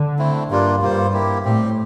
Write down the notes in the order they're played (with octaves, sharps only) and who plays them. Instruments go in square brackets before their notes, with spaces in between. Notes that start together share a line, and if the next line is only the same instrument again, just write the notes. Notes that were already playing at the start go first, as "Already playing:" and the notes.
Already playing: [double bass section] D3
[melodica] A3 C4 E4
[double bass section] G2 [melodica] G3 A#3 D4 F4
[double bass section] G2 [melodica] G3 A#3 F4 C5
[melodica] A#3 E4 G4
[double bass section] A2 [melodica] G3 C4 G4